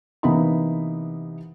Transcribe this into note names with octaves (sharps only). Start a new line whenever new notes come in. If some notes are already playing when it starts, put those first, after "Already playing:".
C3 E3 A#3 B3 D#4 B5